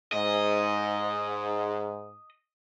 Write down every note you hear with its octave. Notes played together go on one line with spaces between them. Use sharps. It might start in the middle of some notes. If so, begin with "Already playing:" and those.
G#2 D#5